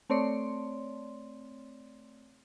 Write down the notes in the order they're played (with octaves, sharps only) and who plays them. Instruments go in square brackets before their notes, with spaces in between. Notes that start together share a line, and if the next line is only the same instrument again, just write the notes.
[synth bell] A3 C4 C#5 D5 C6